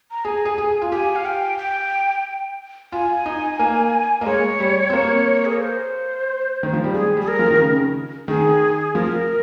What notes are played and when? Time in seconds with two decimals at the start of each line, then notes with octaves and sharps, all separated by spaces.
0.11 A#5
0.25 G#4 G#5
0.45 G#4
0.58 G#4
0.82 F4
0.92 G4 G#5
1.16 F5
1.25 G5
1.58 G5
2.92 F4 G#5
3.26 D#4
3.59 A#3
4.21 A#3 D#5
4.26 G#3 C#5
4.60 G3
4.90 C4
4.93 A#3
5.45 G#4
5.53 A#4
5.60 C5
6.63 D#3
6.73 F3
6.84 G3
6.94 G#3 G#4
7.17 G3
7.21 G#4
7.28 A#4
7.39 F3
7.51 D#3
7.61 C#3
8.28 D#3 G#4
8.95 F3 A#4